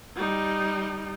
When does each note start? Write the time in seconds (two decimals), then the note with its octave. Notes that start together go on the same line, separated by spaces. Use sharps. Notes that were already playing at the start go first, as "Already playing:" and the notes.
0.16 G3 D#4